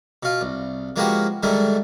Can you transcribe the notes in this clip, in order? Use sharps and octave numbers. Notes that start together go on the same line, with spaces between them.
B2 F4
C2
F3 G#3 A#3 B3 F#4 G4
G#2 D3 D#3 G3 A3